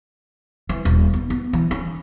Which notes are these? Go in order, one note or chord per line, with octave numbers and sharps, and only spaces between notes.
E3
D#1
B3
B3
E3
C#4